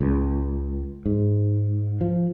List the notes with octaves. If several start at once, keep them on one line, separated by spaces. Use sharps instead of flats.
C#2
G#2
F3